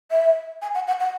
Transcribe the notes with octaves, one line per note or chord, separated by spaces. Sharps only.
E5
G#5
F#5
F#5
F#5